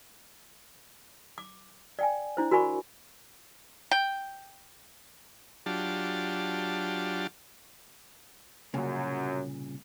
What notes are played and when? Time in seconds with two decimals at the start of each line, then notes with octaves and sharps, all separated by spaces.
1.38 D6
1.99 D5 G5 G#5
2.37 D4 E4 C5
2.51 F#4 A#4 D5 G#5 B5 C#6
3.91 G5
5.66 F#3 D4 F4 G4 A5
8.74 C2 F#2 A#2 C#3 F#3